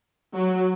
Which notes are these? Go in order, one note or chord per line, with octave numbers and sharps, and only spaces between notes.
F#3